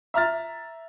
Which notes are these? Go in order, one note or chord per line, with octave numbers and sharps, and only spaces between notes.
E5 A#5 F6 A6